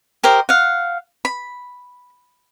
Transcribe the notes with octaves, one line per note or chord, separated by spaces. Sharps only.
G4 A#4 C5 D#5
F5 F#5
B5